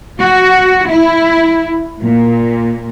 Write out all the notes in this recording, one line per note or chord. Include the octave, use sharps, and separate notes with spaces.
F#4
E4
A#2